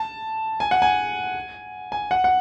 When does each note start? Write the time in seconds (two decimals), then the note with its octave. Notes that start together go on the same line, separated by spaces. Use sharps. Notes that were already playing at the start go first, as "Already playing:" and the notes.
Already playing: A5
0.60 G#5
0.71 F#5
0.82 G#5
1.92 G#5
2.11 F#5
2.24 F#5